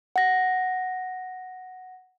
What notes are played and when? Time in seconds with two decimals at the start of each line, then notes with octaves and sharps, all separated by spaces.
0.16 F#5 A#6